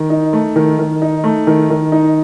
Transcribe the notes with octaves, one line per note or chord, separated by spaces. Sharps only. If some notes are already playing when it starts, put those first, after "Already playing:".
Already playing: D#3
D#4
A3
D#3
D#3
D#4
A3
D#3
D#3
D#4